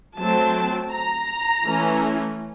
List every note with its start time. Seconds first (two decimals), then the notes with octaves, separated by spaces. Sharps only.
0.18 F#3 A3 C4 A5
0.91 A#5
1.65 E3 A3 C#4